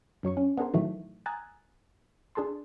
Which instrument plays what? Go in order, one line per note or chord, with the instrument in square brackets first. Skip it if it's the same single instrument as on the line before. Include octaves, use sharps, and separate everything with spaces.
[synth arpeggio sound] F#2 F#3 C#5 C#6
C#4
B3 D4 G#4 A#4 C5
A2 D#3 E3 F#3 A3
G#5 A#5 D#6 E6 F#6 A6
D4 G#4 A4 A5 C6